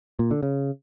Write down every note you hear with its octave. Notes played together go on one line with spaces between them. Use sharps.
A#2
D3
C#3